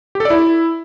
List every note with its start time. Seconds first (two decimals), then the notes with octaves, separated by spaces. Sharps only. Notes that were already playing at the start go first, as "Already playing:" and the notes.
0.15 G4
0.20 A4
0.25 D5
0.30 E4